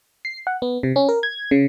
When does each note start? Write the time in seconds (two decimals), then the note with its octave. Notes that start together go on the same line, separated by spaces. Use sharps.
0.25 C7
0.47 F#5
0.62 B3
0.83 C3
0.96 C#4
1.09 A#4
1.23 G#6
1.51 C#3